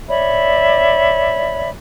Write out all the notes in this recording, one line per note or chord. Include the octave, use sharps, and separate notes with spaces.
C#5 D5 E5 B5